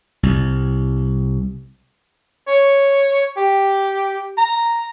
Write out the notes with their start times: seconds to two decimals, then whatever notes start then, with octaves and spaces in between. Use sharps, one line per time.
0.23 C2
2.48 C#5
3.37 G4
4.37 A#5